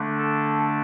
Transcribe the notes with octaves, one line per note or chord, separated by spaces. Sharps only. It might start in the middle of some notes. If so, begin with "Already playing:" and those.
Already playing: D3 A3 D4
A4